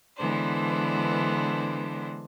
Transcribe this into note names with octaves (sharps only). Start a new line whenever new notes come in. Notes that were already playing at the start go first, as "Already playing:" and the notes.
D3 E3 G#3 B3 D4 C5